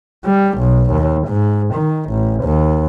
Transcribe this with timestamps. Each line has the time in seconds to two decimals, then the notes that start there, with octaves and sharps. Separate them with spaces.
0.25 G3
0.59 B1
0.91 D#2
1.28 G#2
1.74 D#3
2.10 A1
2.44 D#2